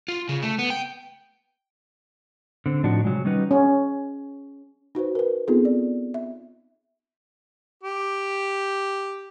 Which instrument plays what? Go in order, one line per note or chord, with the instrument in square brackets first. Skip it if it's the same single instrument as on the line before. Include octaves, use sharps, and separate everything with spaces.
[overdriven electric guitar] F4
C#3
A3
B3
G5
[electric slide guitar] D3 C4
A2 F3 D4 D#4 F#4
C3 F#3 G#3
D#3 G3 C#4 D#4 F#4 B4
[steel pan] C#4
[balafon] D#4 F#4 B4 C5
A#4 B4
B3 C4 D#4 F4 G#4 A4
D5
E5
[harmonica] G4